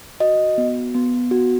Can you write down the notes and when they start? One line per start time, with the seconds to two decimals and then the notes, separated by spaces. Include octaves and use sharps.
0.20 F#4 D#5
0.58 B3
0.94 B3
1.31 F#4